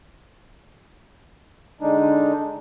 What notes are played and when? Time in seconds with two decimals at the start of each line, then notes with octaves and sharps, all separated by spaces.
1.81 D3 G#3 D4 D#4